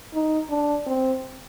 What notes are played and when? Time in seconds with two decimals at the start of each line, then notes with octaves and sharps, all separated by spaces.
0.13 D#4
0.50 D4
0.87 C4